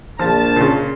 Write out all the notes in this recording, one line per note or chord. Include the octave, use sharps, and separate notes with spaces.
A#1 F3 A5
A#2 C#3